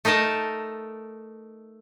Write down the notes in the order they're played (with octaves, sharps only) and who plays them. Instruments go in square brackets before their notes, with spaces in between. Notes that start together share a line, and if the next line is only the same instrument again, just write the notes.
[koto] A3 D#4 A#4 D#5 A5